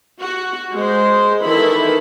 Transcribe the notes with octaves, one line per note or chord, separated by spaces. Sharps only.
F#4
G#3 C5
D#3 E3 E4 A4 B5